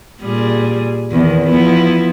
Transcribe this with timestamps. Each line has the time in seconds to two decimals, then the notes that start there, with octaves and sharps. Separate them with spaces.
0.21 A#2 G3 G#4
1.11 E2 D#3
1.44 F3 B3 E4